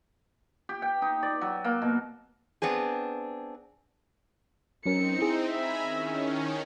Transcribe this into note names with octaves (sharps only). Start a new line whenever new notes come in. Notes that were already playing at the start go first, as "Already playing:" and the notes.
G4
G5
D#4
D5
F#3
A#3
B2
B3 C4 D4 G#4
F#3 C4 C#4 D#4 A#4 C#7
E4 G#4
E5 G#5 A#5 B5
D#3 C#4